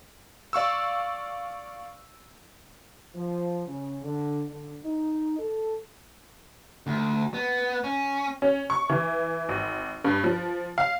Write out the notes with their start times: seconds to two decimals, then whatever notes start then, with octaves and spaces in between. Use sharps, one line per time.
0.53 D5 F5 C#6 E6
3.15 F3
3.67 C#3
4.03 D3
4.49 D3
4.85 D#4
5.38 A4
6.87 D2
7.34 B3
7.84 C#4
8.42 C#4
8.70 C#6
8.89 E3
9.49 G#1
10.04 G2
10.24 F3
10.78 F5